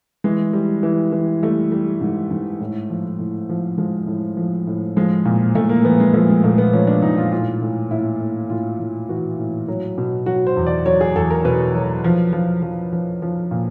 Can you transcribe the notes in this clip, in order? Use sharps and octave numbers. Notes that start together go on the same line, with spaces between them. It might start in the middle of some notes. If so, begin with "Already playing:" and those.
E3 G#3
G3
E3
E3
G3 A3
G3
G#2
G#2
A2
F3
A2
F3
F3 G#3
A2
F3
A2
F3 G#3
A#2
A#2 A3
A#3
F3 B3
G#3
F3 A3
G#3
A#2 A3
B3
F3 C#4
D4
A#2 D#4
F4
A2 F4
A2
A2 E4
A2
A2 F4
A2
E3 F#4
A2
F#3
B2
F#3 F#4
C5
E2
D5
F#3 C#5
G#4
E2 A4
A#4
B2 B4
F#3
F3
F3
F3
F3
F3
A#2